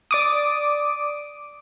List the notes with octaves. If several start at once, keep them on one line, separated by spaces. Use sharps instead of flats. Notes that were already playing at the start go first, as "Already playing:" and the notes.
D5 D6 D#6